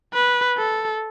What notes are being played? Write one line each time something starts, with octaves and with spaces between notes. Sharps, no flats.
B4
A4